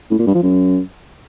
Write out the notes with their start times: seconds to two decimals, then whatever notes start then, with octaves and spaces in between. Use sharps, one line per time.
0.11 A2
0.19 A#2
0.27 G2
0.35 F3
0.43 F#2